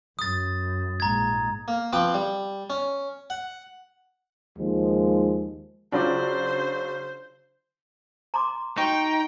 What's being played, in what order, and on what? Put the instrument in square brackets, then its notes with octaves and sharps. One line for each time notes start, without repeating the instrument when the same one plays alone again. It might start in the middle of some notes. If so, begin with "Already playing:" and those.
[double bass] F#2 [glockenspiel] D#6 A6
[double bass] A#1 G#2 [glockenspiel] A#5 G#6
[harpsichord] A#3
F3 C4 B4 G5 D6
G3
C#4
F#5
[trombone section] D#2 F3 G#3
[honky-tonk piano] C#3 F#3 D4 [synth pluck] C#4 F4 D5 [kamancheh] C5
[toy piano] A#5 C6 D6
[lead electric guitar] D#4 [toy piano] F#4 C#6 [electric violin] G5